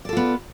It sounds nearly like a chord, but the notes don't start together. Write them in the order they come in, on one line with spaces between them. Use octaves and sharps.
D5 A4 F4 B3